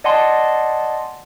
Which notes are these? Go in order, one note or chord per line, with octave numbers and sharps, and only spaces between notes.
D5 D#5 F#5 G#5 A5 C6